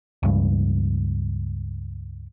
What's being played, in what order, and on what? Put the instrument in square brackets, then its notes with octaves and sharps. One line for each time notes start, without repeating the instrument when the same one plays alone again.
[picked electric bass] C#2 G2